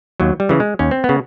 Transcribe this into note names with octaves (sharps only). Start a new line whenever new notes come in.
D#2 F#3
G3
C#3 E3
G#3
D#2 C#4
C4
B3
C#3